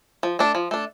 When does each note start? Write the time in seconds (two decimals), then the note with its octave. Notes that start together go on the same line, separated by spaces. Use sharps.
0.23 F3
0.39 A3 D4
0.55 F3
0.71 A3 D4